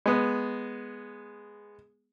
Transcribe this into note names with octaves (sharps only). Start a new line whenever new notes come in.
G#3 B3